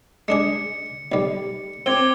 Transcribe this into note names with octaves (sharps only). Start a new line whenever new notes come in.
G#3 D4 G#4 C#7
B1 G3
C4 D6 G#6 G7